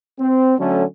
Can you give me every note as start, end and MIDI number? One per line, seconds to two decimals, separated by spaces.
0.18 0.55 60
0.58 0.84 50
0.58 0.84 54
0.58 0.84 57
0.58 0.84 61